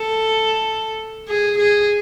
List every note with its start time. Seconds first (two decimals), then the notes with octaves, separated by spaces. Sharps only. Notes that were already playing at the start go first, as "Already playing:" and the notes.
Already playing: A4
1.28 G#4
1.59 G#4